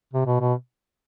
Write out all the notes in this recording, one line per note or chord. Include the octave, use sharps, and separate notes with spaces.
C3
B2
B2